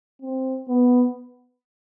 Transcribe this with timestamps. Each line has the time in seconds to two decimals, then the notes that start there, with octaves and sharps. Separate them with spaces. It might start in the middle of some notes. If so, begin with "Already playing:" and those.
0.22 C4
0.68 B3